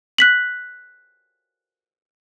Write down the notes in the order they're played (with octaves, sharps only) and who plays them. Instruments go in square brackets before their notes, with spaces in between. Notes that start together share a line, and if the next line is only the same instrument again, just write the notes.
[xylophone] F#6 B6 F#7